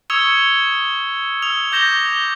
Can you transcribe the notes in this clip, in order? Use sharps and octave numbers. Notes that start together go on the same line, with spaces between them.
C#6 D#6 E6 G#6 C#7 F7
D#6 E6 F7
D6 G6 A#6 E7 F7 G7